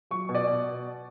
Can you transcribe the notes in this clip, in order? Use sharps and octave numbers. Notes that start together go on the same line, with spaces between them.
F#3 C#6
B2
D5
B2